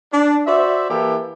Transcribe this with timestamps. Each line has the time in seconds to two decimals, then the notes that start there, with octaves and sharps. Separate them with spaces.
0.12 D4
0.46 F#4 C5 D5 E5
0.90 E3 A#3 E4 G4 A4 B4